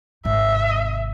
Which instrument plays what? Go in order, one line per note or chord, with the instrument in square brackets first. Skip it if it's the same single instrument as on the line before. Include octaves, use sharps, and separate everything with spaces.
[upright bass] G#1 C3 [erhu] E5